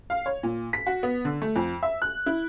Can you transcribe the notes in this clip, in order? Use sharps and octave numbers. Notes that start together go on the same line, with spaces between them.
F5
C#5
A#2
B6
F#4
B3
D3
A3
F2
E5
F#6
E4